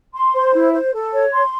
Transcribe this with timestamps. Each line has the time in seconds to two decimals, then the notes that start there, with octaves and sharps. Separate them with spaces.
0.14 C6
0.33 C5
0.53 E4
0.73 C5
0.93 A4
1.12 C#5
1.33 C6